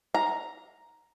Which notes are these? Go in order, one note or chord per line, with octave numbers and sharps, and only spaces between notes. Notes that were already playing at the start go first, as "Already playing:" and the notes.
A#5